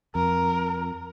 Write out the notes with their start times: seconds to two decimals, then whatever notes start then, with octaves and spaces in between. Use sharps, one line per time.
0.15 F2 A#4